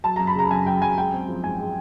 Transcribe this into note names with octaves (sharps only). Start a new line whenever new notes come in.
F#3 A5
F#2 A#5
B5
C#3 A#5
F#2 G#5
F#3 G5
F#2 G#5
G#3 G5
C4
F3
G#2 G#5
G#3